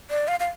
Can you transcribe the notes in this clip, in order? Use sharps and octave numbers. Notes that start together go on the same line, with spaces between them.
D5
F5
F5